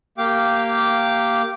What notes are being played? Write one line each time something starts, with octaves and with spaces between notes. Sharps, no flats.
A#3 G4 F5 G5 D6